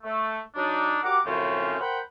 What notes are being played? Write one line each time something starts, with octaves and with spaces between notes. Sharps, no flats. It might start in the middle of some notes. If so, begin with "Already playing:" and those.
A3
F#3 D4 D#4
F#4 G4 A#4 F#5 D6
F#2 A2 C#3 F3 C4 C#4
A#4 C5 F#5 G5 B5